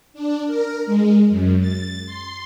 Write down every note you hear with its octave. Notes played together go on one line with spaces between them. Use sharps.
D4
A#4
G#3
F#2
A6
C6